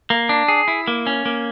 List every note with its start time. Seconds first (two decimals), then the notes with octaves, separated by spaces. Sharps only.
0.10 A#3
0.29 D4
0.48 G#4
0.68 E4
0.88 A#3
1.07 C#4
1.26 A#3